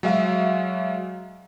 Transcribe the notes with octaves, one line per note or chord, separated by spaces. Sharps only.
F#3 G#3 E5 F5